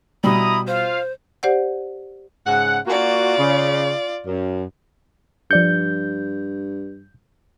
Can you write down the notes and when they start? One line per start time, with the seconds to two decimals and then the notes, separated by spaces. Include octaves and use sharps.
0.24 B2 G3 E4 A#5 B5 D#6
0.67 F4 C5 F5
1.43 G4 C5 D5 F#5
2.46 G#2 C#3 F#5
2.87 A#3 F4 F#4 D5
3.38 C#3
4.26 F#2
5.51 G2 F3 D5 G6 C#7